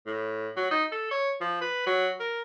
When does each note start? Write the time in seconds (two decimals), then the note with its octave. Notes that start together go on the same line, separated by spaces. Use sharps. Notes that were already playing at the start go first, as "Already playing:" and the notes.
0.07 A2
0.57 F#3
0.71 D#4
0.92 A4
1.11 C#5
1.41 F3
1.62 B4
1.87 F#3
2.20 A#4